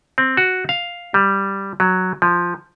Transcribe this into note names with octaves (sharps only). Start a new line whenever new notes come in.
C4
F#4
F5
G3
F#3
F3